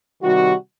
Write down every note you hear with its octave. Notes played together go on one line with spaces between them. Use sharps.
C3 D#3 G3 F#4